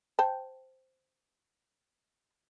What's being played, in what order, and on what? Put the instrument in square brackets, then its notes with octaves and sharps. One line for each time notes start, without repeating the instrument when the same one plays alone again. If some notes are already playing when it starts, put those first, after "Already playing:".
[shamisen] C5 G5 A5